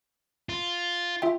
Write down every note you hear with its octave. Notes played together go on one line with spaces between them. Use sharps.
F4
F4 E5 G5